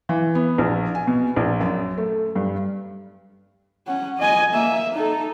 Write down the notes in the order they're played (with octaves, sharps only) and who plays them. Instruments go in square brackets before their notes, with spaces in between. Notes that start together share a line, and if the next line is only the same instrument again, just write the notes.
[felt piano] E3
B3
A#1
G#5
B2
A#1
F#2
A3
G2
[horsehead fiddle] C#4 F#5
D#5 G#5
A#3 E5
D#4 A4